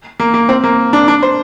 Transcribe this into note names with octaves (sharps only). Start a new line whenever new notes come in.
A#3
A#3
C4
A#3
D4
D4
C5